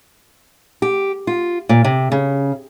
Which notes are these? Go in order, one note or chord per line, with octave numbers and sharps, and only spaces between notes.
G4
F4
A#2
C3
C#3